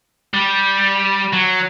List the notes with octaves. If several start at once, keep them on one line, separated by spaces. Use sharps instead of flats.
G3
F#3